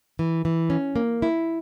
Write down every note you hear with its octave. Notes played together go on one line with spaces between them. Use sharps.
E3
E3
C#4
A#3
E4